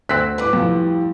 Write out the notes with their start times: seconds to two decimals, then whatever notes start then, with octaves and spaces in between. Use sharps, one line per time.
0.09 D2 C4 F#6 B6
0.38 A2 G3 B4 D6
0.53 F2